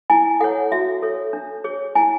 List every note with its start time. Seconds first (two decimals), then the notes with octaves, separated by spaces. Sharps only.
0.10 E4 G#5
0.40 A4 C#5 F#5
0.72 F#4 E5
1.02 A4 C#5
1.33 D4
1.64 G#4 C#5
1.95 E4 G#5